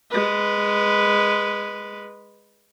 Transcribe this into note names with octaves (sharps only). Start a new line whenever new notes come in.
G#3 B4